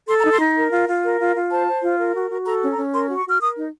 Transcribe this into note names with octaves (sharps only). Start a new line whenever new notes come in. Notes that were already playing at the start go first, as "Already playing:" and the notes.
A4 C6
A#5
D#4
C6
D#4
A#4
F4
F4
A#4
F4
F4
C5 A5
C5
F4
A#4
F#4
F#4
A4 A#5
C#4
A#5
C#4
A#4 C6
F#4
C#6
F#4 F6
A#4 D#6
D#4